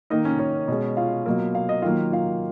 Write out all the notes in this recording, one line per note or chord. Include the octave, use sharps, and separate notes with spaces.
D#3 A#3 D#4 D#5
C#4 C#5
C#4 C#5
B2 G#3
F4 F5
B2 F#3 A#3
F5
D#5
D#3 F#3 A#3 F4 F5
F4 F5